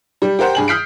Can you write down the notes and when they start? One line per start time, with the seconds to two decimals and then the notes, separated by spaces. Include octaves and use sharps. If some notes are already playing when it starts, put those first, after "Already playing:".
0.22 G3
0.39 G4 A#4 C5 F#5 G5
0.55 G2 G#4 F#7
0.68 D#6 F6 G6 B6 C7 D7